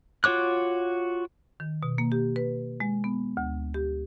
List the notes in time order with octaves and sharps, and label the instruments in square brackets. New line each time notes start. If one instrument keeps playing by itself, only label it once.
[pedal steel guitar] F4 F#4 C#5 D6 F#6
[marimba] D#3
B2
A#3
G4
B4
G#3
B3
D2
G4